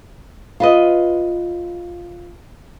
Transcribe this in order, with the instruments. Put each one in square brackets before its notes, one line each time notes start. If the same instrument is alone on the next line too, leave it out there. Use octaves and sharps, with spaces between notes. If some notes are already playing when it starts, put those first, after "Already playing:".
[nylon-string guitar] F4 B4 D#5